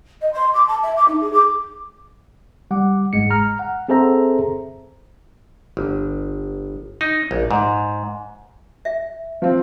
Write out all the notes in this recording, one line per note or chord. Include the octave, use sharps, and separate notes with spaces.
D#5
C6
D6
A5
E5
D6
D#4
G#4
D6
G3 F#5 D6
G1 G#2 G#3 C#7
A#5 F6
F#5
C4 G#4 A4 C5 E5 A#5
G1
D#4
A#1
G#2
E5
F3 C4